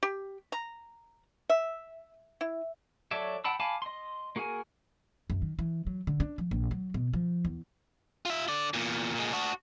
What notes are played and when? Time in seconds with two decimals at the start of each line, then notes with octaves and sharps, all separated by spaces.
0.03 G4
0.52 A#5
1.50 E5
2.41 E4
3.11 F#3 A4 C#5 D5 E5
3.44 F#5 G5 A5 B5 E6
3.60 F5 G#5 A5 B5 D6
3.82 D#5 C6
4.36 A#3 F#4 G#4 A#4 G#5
5.30 F#2
5.42 D#3
5.59 E3
5.87 F#3
6.07 D3
6.20 D4
6.38 F3
6.51 A#1
6.71 F#3
6.94 B2
7.13 F3
7.45 E2
8.25 F4 E5
8.48 D3 D5
8.74 E2 A#2
9.14 A#2 G#3
9.32 D4 F#4